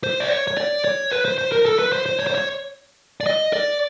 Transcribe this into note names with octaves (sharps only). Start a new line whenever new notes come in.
C5
D5
C#5
C#5
D5
C#5
B4
C5
C5
A#4
A4
B4
C5
C5
C#5
C5
C#5
D5
D#5
D5